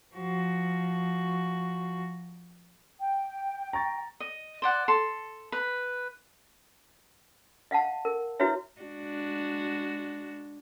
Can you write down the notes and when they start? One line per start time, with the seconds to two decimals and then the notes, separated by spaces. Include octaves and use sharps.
0.15 F3 F#4
2.99 G5
3.73 A#5 C#6 A6
4.20 D#5
4.62 C5 D5 F#5
4.88 A4 C6
5.52 B4 B5
7.71 D#5 F5 F#5 A5
8.05 A#4
8.40 E4 F#4 B4 C#5 E5
8.81 G#3 D4 F#4